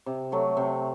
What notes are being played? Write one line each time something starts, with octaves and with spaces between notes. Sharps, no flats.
C3
F#3 A3
C3